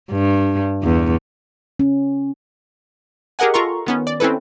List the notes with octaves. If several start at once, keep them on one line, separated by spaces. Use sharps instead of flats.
G2
E2
C#4
G4 G#4 A#4 D#5 F#5 G#5
F4 A4 A#4 A#5 C6 C#6
D#3 B3 C#4
D5
C4 C#4 E4 A4 B4